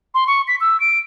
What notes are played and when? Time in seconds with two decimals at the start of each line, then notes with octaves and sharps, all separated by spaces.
0.14 C6
0.27 C#6
0.48 B6
0.61 E6
0.80 D7